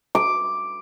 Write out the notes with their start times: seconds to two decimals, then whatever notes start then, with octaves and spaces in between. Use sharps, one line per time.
0.15 D6